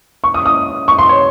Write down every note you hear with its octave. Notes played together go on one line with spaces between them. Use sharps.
C#6
D#6
D#6
C#6
C6
C#5